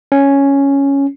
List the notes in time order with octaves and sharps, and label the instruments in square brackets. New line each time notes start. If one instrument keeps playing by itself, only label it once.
[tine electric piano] C#4